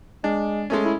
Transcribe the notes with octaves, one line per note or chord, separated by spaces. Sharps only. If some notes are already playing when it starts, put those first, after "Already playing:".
G#3 D4
G#3 A3 C#4
E4